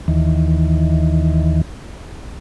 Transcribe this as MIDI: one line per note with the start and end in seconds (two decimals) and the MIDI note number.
0.08 1.61 39
0.08 1.61 51
0.08 1.61 52